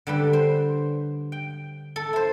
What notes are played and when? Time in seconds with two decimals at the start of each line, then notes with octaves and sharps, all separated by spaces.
0.07 D3 G3 B4
0.33 C5
1.32 G5
1.96 A4
2.13 E4 C5